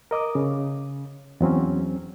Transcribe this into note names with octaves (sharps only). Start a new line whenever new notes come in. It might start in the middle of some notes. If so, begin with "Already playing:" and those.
A#4 D#5 D6 D#6
C#3
E2 F#3 C4 C#4